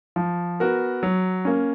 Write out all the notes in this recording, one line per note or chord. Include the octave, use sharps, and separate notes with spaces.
F3
B3 F#4 A#4
F#3
A#3 C#4